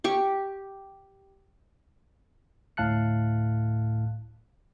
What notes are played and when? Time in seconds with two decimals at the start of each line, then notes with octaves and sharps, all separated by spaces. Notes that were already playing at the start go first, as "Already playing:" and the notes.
0.04 G4 C#6
2.77 D2 A2 F5 A5 F#6 C#7